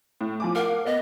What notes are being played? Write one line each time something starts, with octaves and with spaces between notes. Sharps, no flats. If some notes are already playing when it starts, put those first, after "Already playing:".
A2
F3 G#5 D6
A#4 F5 F#5
B3 D#5